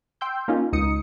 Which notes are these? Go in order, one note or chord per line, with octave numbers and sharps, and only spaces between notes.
G5 C6 E6 G6
A#3 C#4 D#4 F4
C#2 D#4 D#6 C#7